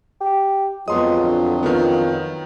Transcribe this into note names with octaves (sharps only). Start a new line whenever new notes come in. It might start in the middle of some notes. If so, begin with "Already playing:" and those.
G4
F2 F#3 G#3 B3 F4 C6 D#6
D3
D#3 B3 F4